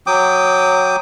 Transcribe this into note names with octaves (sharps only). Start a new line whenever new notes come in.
F#3 G5 D6 D#6